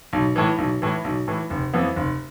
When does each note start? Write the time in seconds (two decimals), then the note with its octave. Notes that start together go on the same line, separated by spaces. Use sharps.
0.13 B1
0.36 A2 E3
0.58 B1
0.82 A2 E3
1.04 B1
1.28 A2 E3
1.50 F1
1.73 F2 E3 B3
1.96 F1